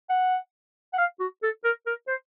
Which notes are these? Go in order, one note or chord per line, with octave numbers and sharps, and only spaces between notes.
F#5
F#5
F5
F#4
A4
A#4
A#4
C5